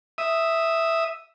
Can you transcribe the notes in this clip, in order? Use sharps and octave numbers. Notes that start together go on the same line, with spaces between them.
E5 D#6